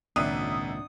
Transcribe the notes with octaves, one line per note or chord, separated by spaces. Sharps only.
G#1 C#2 A#2 D4 E5 D#6 D#7